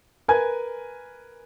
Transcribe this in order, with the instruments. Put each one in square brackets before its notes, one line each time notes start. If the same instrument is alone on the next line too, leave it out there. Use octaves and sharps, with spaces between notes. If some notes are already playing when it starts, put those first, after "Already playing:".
[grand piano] A#4 B4 G#5 G#6